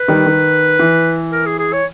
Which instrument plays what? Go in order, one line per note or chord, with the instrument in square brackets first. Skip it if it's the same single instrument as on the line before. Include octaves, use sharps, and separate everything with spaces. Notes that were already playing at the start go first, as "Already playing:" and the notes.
Already playing: [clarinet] B4
[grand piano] D#3 G3
D#3
E3
[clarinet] A#4
G#4
G#4
C#5